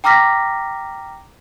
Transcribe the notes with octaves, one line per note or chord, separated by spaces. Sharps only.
G5 A#5 D6 F6 A#6 B6